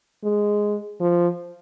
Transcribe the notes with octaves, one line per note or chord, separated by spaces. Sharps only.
G#3
F3